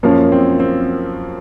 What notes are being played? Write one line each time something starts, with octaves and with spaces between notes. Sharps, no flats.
F#2 F3 A#3 C#4
C4
C4